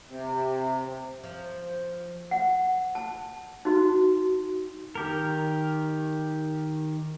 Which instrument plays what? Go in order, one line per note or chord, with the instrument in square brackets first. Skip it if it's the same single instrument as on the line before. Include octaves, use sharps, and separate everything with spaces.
[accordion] C3
[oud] F3
[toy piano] F#5
A5
D#4 F#4
[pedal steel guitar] D#3 G4 A#4